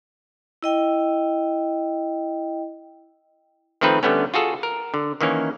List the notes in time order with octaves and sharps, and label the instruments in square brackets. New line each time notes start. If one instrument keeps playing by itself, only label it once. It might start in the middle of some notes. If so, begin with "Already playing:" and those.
[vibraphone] E4 D#5 G5
[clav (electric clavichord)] D#3 F3 A3 C4 D#4 B4
D3 G3 A3 B3 C#4
F4 F#4 G#4 A4
A#4
D3
D#3 E3 A#3 C#4